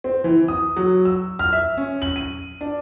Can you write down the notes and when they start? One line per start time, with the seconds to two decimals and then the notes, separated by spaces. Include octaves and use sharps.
0.04 C4
0.24 E3
0.48 D#6
0.76 F#3
1.05 E6
1.39 F6
1.53 E5
1.78 C#4
2.02 F#7
2.16 D#7
2.61 D4